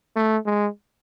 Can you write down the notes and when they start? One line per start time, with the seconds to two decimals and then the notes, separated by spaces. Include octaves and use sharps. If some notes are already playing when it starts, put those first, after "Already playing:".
0.16 A3
0.46 G#3